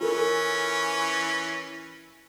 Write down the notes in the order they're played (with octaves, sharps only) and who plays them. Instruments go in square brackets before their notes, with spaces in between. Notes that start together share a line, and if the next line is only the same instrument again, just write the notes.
[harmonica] E3 C#4 [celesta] F4 A4 A#4